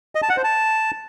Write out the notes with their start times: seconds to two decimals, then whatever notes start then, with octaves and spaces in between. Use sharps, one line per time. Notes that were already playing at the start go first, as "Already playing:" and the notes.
0.15 D#5
0.22 A5
0.29 F#5
0.37 C5
0.44 A5